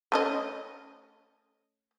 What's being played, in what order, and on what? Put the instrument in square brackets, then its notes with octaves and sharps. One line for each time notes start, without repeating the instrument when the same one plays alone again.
[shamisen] A3 C#4 D#5